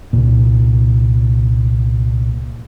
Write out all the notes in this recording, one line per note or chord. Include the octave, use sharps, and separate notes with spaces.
C2 A#2